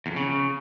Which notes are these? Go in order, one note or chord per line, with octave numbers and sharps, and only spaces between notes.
E2
F2
C#3